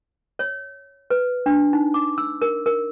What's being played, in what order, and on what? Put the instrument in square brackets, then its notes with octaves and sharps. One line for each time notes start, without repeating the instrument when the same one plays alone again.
[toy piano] C#5
B4
D4
D#4
D6
E6
A#4
A#4